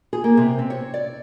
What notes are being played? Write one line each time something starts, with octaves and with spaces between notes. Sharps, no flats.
G#4
A#3
C3
C4
C#5
D5